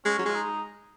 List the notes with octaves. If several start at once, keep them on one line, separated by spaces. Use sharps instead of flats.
G#3 C#4
F#3
G#3 F4
D#4